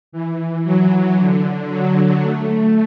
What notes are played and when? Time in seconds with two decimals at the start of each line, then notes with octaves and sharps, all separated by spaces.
0.12 E3
0.64 F#3
1.17 D3
1.69 F#3
2.22 A3